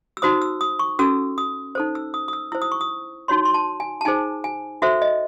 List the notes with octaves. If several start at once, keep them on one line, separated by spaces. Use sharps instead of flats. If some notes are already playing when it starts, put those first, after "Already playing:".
E6
D#4 F#4 C5 D#6
E6
D#6
C#6
C#4 F#4 A4 E6
D#6
D#4 A4 C5
E6
D#6
D#6
E6
E4 C5 E6
D#6
C#6
D#6
D#4 F#4 C#5 C6
C6
A5
G#5
A5
D#4 G#4 C5 G#5
G#5
F#4 A4 C5 E5
D#5